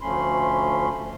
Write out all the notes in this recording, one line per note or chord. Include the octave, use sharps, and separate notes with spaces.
D2 F3 A3 C#4 B5 C6